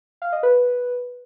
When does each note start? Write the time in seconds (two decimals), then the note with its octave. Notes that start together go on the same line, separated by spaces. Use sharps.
0.22 F5
0.32 D#5
0.43 B4